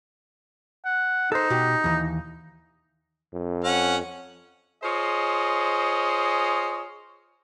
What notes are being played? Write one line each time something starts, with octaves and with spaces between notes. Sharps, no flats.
F#5
D#4 A4 C5
B2 F#4 G4
D#2 E3
F2
C#4 F#5
F4 G#4 C5 C#5 D#5